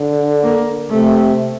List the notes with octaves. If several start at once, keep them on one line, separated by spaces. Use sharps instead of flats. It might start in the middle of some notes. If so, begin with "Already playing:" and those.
Already playing: D3
A#3
C3 A3